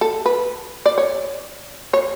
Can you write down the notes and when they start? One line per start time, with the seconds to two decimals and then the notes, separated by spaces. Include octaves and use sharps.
0.01 A4
0.26 B4
0.86 D5
0.98 C#5
1.93 C#5